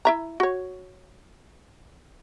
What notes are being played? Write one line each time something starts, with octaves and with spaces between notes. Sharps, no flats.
E4 E5 A#5
F#4 C#5